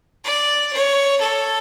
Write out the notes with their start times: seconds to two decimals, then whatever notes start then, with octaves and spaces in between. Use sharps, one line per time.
0.24 D5
0.72 C#5
1.21 A4